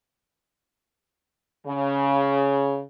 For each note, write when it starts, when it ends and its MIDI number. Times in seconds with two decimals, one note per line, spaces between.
1.67 2.80 49